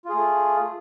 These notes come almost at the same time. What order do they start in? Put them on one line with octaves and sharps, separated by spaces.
F4 G#4 A3